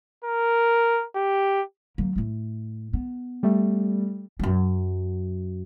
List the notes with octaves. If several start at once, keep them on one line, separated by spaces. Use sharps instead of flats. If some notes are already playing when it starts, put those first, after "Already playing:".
A#4
G4
F#3 A#3
A2 A3
B3
G3 A3
F#2 F#3